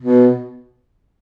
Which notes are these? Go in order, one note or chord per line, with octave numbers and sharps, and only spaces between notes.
B2